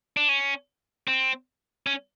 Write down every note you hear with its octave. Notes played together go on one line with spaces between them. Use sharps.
D4
C#4
C4
C#4